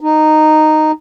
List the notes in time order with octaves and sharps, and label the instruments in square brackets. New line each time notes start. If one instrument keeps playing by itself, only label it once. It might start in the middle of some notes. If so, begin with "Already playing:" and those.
[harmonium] D#4